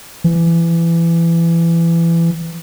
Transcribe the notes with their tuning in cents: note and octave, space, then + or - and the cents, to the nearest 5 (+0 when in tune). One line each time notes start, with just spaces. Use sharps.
E3 +25